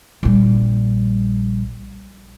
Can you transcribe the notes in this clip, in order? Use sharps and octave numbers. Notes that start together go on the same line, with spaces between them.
A#1 G3